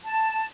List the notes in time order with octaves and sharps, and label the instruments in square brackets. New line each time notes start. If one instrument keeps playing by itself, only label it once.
[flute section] A5